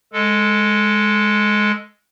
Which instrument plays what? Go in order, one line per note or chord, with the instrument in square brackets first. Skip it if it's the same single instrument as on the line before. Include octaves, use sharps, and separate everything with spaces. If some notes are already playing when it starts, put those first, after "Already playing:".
[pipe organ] G#3 A4